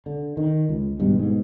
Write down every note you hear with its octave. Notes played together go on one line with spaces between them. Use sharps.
D3
D#3
C#2
G#1 G2 B2
G#2 B2